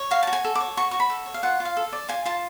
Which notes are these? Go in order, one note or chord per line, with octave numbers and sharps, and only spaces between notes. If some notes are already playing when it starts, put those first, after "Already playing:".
Already playing: C#5
F#4 F5
A5
F#4
G#5
A4
D6
C#5
F#4 C#6
F#4 C#6
B5
A4
C#5
F5
F4 F#5
F4
F5
A4
D5
F4 G#5
F4 A5